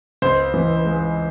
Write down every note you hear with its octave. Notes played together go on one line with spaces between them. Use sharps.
C#2 C5
E3
G#3